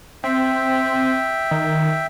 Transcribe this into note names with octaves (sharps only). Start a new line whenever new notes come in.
C4 E5 G5
D#3